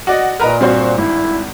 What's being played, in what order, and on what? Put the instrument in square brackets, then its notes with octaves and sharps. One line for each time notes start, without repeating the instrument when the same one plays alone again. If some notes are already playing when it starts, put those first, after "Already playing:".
[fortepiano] F#4 D5 D#5 [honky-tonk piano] F#5
[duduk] A#2 [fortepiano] A#4 B4 [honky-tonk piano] D#5 A#5 F6
[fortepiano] G2 [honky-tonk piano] C4 F#4 C5
[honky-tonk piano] G#1 [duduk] E4